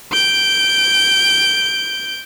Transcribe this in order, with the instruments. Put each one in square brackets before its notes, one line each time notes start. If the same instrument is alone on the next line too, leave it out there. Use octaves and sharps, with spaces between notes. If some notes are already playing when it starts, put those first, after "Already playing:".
[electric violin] G6 D7